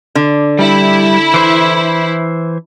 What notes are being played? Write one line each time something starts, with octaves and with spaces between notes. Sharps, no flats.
D3
G3 E4
E3 C5 E5